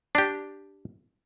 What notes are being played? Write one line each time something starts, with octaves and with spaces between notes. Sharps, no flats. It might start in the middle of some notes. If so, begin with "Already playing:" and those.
D4 G4